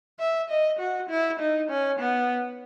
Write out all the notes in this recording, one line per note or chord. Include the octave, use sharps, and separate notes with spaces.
E5
D#5
F#4
E4
D#4
C#4
B3